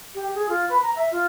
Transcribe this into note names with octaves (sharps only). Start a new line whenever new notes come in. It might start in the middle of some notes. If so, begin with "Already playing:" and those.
G4
G#4
F4
B4
A#5
E5
F4